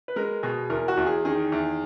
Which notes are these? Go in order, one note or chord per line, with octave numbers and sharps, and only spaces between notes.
B4
G#3 A#4
B2 G#4
E2 A#4
F#4
E2
G#4
D#3 G#4
E2